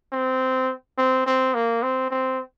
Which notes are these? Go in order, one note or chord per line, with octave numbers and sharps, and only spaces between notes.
C4
C4
C4
A#3
C4
C4